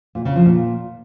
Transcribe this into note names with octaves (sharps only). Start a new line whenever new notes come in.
A#2
C#3
F3
A#2